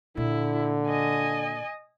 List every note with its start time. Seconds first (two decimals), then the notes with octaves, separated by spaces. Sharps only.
0.17 A#2 D3 E4
0.87 D#5 G#5